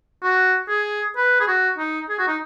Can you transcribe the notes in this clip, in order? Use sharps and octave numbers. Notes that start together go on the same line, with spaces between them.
F#4
G#4
B4
G#4
F#4
D#4
G#4
F#4
D#4